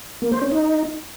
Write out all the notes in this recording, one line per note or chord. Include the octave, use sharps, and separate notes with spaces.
A#3
C5
C#4
D#4